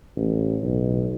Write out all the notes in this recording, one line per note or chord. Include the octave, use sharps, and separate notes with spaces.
A1
B1